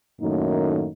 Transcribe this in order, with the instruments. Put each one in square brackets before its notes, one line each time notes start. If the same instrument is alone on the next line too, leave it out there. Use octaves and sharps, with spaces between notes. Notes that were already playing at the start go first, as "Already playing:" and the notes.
[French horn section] F#2 A2 D#3 A3 A#3 D#4